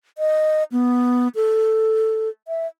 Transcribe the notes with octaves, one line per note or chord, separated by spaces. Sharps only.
D#5
B3
A4
E5